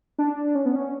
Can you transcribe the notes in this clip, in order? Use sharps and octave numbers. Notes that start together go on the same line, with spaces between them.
D4
C#4
B3
C#4